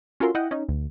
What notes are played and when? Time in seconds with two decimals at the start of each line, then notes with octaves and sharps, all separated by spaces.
0.20 C#4 F4 F#4 A4 A#4 C6
0.35 E4 D#5 F#5 G5
0.51 C#4 D#4
0.69 D2